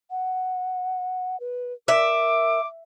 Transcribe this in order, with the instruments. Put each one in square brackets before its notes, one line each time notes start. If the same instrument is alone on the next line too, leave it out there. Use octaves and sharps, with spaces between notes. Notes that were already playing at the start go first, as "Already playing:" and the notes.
[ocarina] F#5
B4
[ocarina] A#4 [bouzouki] E5 [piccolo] D6